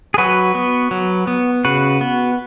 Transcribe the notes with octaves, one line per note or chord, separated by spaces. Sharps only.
G#4
F#3 F#4 B4
B3
F#3
B3
C#3 F#4 B4
B3